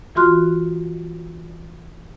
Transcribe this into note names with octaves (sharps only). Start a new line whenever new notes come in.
E3 F4 F#4 C6 F6 F#6